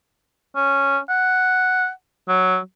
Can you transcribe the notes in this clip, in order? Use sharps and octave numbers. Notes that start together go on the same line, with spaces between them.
C#4
F#5
F#3